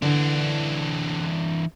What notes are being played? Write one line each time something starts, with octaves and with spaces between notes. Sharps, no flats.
D3 E3 D4